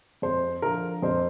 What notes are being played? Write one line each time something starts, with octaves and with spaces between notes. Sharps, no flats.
F2 C5
D3 F3 A#4
F2 C5